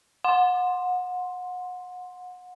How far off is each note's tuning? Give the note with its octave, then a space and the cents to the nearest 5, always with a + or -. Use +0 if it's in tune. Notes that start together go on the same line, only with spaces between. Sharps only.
F#5 -30 C6 +0